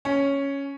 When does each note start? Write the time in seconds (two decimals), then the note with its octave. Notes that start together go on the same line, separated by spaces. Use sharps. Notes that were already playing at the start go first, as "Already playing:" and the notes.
0.05 C#4